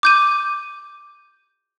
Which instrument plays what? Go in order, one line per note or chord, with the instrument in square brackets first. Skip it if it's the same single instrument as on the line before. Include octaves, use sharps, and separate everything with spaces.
[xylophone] D6 G6 D#7